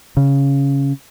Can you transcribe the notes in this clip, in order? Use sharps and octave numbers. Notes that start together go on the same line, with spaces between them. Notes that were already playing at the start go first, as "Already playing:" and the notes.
C#3